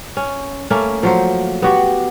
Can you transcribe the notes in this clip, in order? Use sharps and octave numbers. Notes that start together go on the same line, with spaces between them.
C#4
A3 A#3 C#4
F3 F#3 C5
B3 F#4 G4